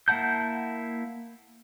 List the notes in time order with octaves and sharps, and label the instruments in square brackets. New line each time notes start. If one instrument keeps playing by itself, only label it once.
[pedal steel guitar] A#3 E4 F#5 A5 G6